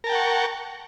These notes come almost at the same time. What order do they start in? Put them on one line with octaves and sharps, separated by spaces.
A#4 A5 G5 F#5 C#6